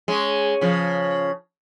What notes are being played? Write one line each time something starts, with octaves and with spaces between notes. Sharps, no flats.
G#3 C#4
C#3 F3